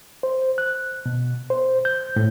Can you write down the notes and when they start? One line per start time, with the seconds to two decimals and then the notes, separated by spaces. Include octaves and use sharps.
0.23 C5
0.58 F#6
1.06 B2
1.50 C5
1.85 G6
2.16 A2